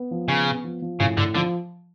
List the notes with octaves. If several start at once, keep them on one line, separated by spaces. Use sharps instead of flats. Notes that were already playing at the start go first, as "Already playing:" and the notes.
Already playing: B3
F3
C#3 B3
B3
F3
F3
A2 C#3
A2 D3
D3 F3